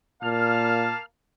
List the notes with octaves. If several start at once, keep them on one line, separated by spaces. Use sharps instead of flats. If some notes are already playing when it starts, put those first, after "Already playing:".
A#2 A#3 F5 A5 F6